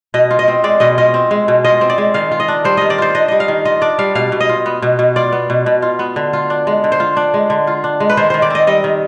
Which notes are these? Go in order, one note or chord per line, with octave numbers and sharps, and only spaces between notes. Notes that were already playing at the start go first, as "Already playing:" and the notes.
B2 D#5
F4
D#5
C4
G#3 D5
B2 D#5
F4 D#5
C4
G#3
B2
F4 D#5
C4
D5
G#3
D#3 F5
F4
D#5
D4
G3 C5
D#3 D#5
D5
F4 C5
D4 D#5
G3 D#5
F5
D#3
F4 D#5
D4 D5
G3 F5
B2 F5
B2
D#5
F4
B3
B2
B2
F4 D5
B3
B2
B2
F4
B3
D3
F4
D4
G#3
D3
C5
F4
D4
G#3
D3
F4
D4
G#3
B4
D#3 C5
D#3 C5
D5
C4 D#5
G3 D#5
D#3